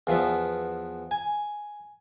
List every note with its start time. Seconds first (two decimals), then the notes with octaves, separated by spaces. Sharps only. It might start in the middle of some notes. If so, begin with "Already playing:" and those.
0.07 E2 F3 B3 E5
1.11 G#5